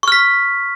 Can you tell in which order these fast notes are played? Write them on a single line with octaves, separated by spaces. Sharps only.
C#6 F6 B6